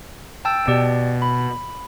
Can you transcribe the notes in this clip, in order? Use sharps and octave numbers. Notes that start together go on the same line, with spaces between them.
G5 A5 E6
B2 G4 D5
B5